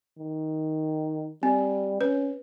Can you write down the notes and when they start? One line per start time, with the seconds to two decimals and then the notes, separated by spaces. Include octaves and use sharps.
0.18 D#3
1.43 G3 C4
2.01 C#4 B4